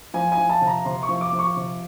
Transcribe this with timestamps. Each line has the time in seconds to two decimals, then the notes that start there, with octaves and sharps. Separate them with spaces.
0.14 F3 G#5
0.32 G#5
0.38 F3
0.50 A5
0.61 C3
0.67 A#5
0.85 C3 C6
1.03 C#6
1.09 F3
1.21 D6
1.33 F3
1.39 C#6
1.57 C3